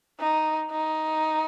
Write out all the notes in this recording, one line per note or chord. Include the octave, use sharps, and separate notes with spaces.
D#4
D#4